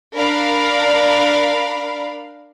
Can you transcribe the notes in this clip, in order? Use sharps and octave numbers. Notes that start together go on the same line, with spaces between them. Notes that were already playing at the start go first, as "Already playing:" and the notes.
D4 A#4 D5 F5 B5